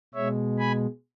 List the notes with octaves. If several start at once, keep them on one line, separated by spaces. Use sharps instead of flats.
B2 G#3 C#5 E5
G#5 B5